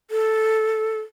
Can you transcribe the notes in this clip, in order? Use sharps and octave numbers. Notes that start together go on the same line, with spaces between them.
A4